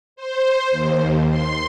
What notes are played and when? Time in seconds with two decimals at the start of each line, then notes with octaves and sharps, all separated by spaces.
0.16 C5
0.71 D#2
1.29 C6